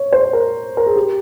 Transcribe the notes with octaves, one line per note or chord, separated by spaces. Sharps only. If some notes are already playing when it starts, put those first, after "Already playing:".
Already playing: C#5
C5
A#4
A#4
G#4
G4